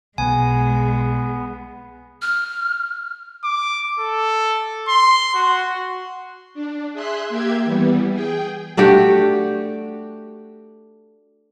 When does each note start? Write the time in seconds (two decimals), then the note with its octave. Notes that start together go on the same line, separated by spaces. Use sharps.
0.18 B1 G#3 B3 G#5
2.22 F6
3.44 D6
3.99 A4
4.88 C6
5.34 F#4
6.54 D4
6.93 G#4 E5 C6 F#6
7.29 A#3 G4 E5 G#6
7.65 E3 G3 B3
8.13 G#4 G5
8.77 A3 D4 F#4 G4